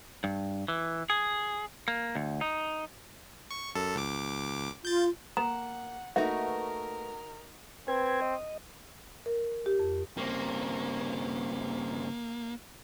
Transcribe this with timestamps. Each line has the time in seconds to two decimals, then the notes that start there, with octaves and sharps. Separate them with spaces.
0.24 G2
0.68 E3
1.10 G#4
1.88 A#3
2.15 D2
2.41 D#4
3.51 C#6
3.75 F#2 A4
3.96 C#2 D6
4.85 F4 G6 A6
5.37 A#3 F#5 A#5
6.16 A3 A#3 D#4 F#4 A#4 B4 E5
7.88 C4 B4 G#6
8.22 D#5
9.26 A#4
9.66 G4
9.79 F2
10.17 G2 C#3 A#3 C4